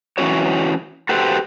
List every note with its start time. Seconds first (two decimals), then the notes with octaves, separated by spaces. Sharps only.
0.18 E3 F3 C#4 F#4 C#5
1.09 F#4 G4 A4 B4 C5